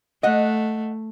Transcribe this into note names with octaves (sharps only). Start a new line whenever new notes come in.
A3 D#5 F#5